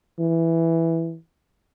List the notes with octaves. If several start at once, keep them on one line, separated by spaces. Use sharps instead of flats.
E3